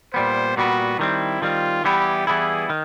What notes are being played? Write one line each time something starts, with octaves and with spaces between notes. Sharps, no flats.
A#2 G3 B3 C5
A#2 G3 B3 F#4
D#3 G3 C4 E4
D#3 G3 C4 F4
E3 G3 B3 E4 G4
E3 G3 B3 E4 G#4
D#3